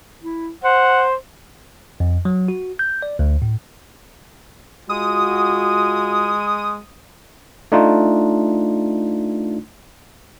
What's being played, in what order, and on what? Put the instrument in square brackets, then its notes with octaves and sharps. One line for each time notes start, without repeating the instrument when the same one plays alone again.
[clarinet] E4
[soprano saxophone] C5 [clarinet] F#5
[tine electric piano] F2
F#3
F#4
G6
D5
D2
A2
[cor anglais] G#3 [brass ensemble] F4 F#4 [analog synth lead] D#6
[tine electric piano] A3 D4 D#4 F4